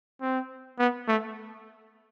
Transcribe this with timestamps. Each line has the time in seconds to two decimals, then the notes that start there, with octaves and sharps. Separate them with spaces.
0.22 C4
0.79 B3
1.08 A3